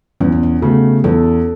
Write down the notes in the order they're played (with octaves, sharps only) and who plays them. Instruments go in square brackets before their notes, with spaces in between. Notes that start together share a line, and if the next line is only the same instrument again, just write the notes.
[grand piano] E2 [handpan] C#4
[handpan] B3
C#4
[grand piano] C#3 A3 [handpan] F#4
[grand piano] E2 [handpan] A4